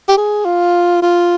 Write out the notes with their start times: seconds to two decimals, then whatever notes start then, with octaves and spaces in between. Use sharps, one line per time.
0.08 G4
0.17 G#4
0.45 F4
1.02 F4